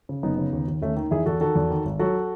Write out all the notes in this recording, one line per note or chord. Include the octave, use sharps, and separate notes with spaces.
C#3
F#1 B3 D#4
C#3
D#2
D#2
D#2 A3 C#4
D#3
E2 E4 G#4
E2 F#4 A4
D#3 F#4 A4
E2
D#3
G#1
F#3 F#4 A4